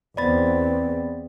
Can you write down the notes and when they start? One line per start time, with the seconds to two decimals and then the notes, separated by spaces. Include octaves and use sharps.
0.17 E2 B3 C4 D5 B5 A6